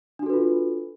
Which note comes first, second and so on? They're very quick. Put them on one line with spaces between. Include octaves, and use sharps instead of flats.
D4 F#4 A4 B4 F4